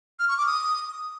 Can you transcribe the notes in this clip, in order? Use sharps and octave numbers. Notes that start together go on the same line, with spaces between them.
F6
C#6
D6
D#6